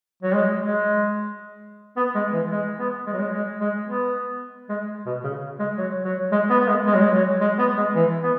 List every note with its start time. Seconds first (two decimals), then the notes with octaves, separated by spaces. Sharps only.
0.23 F#3
0.34 G#3
0.62 G#3
1.97 B3
2.15 G#3
2.33 E3
2.52 G#3
2.79 B3
3.07 G#3
3.13 F#3
3.20 G#3
3.33 G#3
3.60 G#3
3.87 B3
4.69 G#3
5.06 B2
5.24 C#3
5.59 G#3
5.78 F#3
6.05 F#3
6.32 G#3
6.50 B3
6.60 B3
6.68 G#3
6.86 G#3
6.95 F#3
7.02 G#3
7.14 F#3
7.41 G#3
7.59 B3
7.77 G#3
7.95 E3
8.23 B3